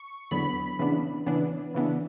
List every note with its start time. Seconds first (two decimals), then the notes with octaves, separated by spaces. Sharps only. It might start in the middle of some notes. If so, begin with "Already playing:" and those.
Already playing: C#6
0.31 E2 D3 F#3 B3 B5
0.79 C#3 E3 B3 D4
1.26 C#3 E3 B3 D4
1.74 C#3 E3 B3 D4